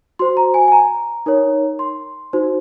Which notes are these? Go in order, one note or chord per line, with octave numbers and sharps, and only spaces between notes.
F#4 C5 C6
A#5
G#5
G#5
A#5
D#4 A#4 C#5
C6
D#4 F#4 C5